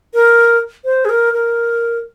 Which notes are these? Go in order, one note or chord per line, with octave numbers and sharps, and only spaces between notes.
A#4
C5
G#4
A#4
A#4